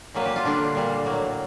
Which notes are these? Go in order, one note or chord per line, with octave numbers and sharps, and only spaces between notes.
A#2 F#3 A#3 B4
G4
F4
D3 G3 A#3 D4
A#2 G3 A#3
A2 F#3 A#3